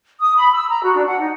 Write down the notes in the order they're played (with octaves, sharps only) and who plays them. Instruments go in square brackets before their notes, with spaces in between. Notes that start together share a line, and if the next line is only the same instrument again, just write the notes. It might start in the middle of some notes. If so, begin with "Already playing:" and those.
[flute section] D#6
B5
E6
A#5
F#4
D4
F#5
D#4